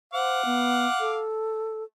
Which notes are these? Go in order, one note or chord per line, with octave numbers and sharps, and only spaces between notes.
C5 F5 F#5 D6
B3
A4